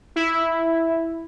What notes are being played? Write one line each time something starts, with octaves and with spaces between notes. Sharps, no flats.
E4